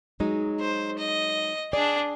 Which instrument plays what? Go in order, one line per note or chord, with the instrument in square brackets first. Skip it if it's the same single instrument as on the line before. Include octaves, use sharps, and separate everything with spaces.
[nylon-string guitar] F#3 G#3 D#4
[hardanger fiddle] C5
D#5
[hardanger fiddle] D4 G#4 [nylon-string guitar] D5